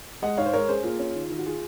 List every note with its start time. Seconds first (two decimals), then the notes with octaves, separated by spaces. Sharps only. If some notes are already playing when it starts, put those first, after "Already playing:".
0.22 G#3 D#5 F#5
0.38 G#2 C#5 F5
0.46 C5
0.53 G#3 A#4 C#5
0.69 C#4 G#4 C5
0.83 A#3 F4 G#4
0.99 C#4
1.15 D#3
1.30 D#3
1.39 F#4
1.46 F4 G#4